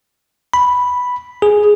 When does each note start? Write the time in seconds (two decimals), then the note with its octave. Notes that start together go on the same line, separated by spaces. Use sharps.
0.54 B5
1.42 G#4